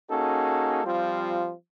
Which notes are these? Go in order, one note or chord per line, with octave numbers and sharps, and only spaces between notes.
A#3 C#4 D#4 F#4 G#4 A4
F3 G3 C4 F4